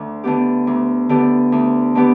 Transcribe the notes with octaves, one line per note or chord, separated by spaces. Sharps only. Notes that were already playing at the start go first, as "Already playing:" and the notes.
Already playing: D2
D3 B3 G4
D2
D3 B3 G4
D2
D3 B3 G4